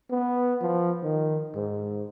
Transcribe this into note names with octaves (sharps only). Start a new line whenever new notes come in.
B3
F3
D#3
G#2